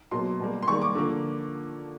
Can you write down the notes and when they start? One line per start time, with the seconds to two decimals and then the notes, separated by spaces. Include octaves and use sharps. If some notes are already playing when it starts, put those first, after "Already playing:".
0.11 B2 F#3 A#3 C6
0.40 B2 G3 A#3
0.62 C6
0.67 D#3 G3 A#3 C#6
0.82 D6
0.95 D3 F3 A#3